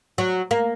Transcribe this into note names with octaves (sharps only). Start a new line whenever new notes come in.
F#3
A#3